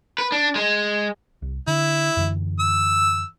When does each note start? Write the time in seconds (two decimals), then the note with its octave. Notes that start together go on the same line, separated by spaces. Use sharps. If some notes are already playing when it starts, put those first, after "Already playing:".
0.18 B4
0.32 D4
0.56 G#3
1.42 C2
1.67 D3 E4
2.17 F#2 D3 E3
2.59 E6